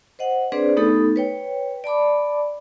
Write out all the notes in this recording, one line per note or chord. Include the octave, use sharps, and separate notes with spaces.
C5 D#5 F#5
C4 D4 G#4 B4 C5 D5
A3 B3 D#4 G4 A4
B4 C#5 G5
D5 A5 B5 D6